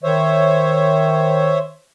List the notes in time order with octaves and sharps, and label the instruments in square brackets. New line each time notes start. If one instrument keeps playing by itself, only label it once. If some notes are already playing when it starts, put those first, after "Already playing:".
[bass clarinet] D#3 [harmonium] C5 C#5 E5